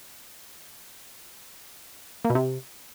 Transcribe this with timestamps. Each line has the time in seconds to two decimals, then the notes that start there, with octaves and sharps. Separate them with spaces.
2.25 A#3
2.30 B2
2.35 C3